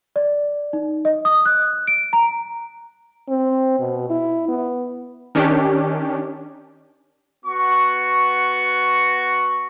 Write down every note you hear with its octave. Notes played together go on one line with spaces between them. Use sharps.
D5
D#4
D#5
D#6
F#6
D7
A#5
C4
B2
E4
B3
D#3 C#4 D4 G4
B3 F#4 C#6